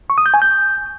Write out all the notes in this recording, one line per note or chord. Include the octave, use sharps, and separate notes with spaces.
C#6
D#6
G6
G#5
G6